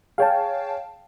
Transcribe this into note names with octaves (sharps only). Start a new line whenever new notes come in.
G#4 C#5 F5 G5 A5